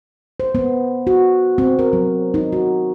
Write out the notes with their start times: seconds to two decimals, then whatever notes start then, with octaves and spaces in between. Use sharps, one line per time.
0.40 C5
0.55 B3
1.07 F#4
1.58 C4
1.79 A#4
1.93 F#3
2.34 D#4
2.52 F#4